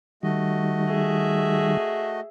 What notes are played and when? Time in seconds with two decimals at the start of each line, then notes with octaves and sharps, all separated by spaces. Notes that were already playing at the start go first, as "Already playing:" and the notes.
0.23 D#3 G3 A3 F#4 D#5
0.89 G#4 E5